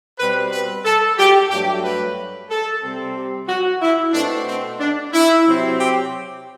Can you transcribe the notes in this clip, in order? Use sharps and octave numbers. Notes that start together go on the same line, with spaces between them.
B2 G3 C4 B4
B4
A4
G4
G2 F#3 A3 G4
B4
A4
C3 G3 C4
G4
F#4
E4
B2 A3 C4 D4
C4
D4
E4
C3 F#3 C4
G4